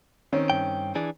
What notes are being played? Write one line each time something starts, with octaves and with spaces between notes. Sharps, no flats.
D#3 C4 C#4
G2 G5
E3 D4 G#4